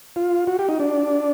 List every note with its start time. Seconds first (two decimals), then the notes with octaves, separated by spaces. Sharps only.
0.16 F4
0.47 F#4
0.59 G4
0.69 D#4
0.80 D4